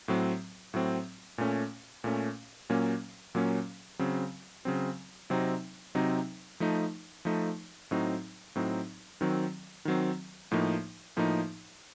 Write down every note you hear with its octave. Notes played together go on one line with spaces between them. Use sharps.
A2 F#3 C4
A2 F#3 C4
A#2 A3 C#4
A#2 A3 C#4
A#2 F#3 A#3 C#4
A#2 F#3 A#3 C#4
C#3 F#3 C4
C#3 F#3 C4
C3 F#3 C4 D#4
C3 F#3 C4 D#4
F3 A3 D#4
F3 A3 D#4
A2 F#3 C4 D#4
A2 F#3 C4 D#4
D#3 F#3 C4
D#3 F#3 C4
A2 F3 A#3 D#4
A2 F3 A#3 D#4